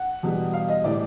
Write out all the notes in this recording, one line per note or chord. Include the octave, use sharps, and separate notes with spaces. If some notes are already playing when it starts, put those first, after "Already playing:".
Already playing: F#5
E2 B2 G3
F5
D#5
A2 E3 G3 D5